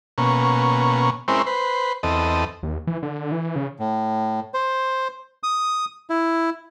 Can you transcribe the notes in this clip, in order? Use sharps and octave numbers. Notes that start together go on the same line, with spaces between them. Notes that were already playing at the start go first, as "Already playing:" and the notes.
B2 A#3 C#4
G#3 C4 C#4 E4 A#4 C5
B4 C5
E2 C4 A4 D#5
D#2
E3
D3
E3
C#3
A2
C5
D#6
E4